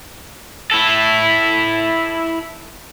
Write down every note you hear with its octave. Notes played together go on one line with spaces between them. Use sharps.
E4 A4